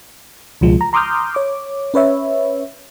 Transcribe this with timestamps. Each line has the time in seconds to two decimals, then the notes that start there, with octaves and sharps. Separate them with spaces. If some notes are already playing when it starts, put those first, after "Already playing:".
0.61 C#2 B2 F3 G#3
0.81 A#5
0.93 A#5 C6 D6 D#6 F6 G6
1.35 C#5 D6
1.94 C#4 B4 C#5 E5